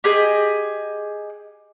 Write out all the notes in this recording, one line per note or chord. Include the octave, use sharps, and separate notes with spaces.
G4 G#4 D#5